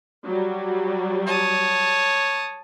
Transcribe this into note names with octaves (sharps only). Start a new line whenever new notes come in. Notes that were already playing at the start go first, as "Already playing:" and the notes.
F#3 G3
C#5 A5 D#6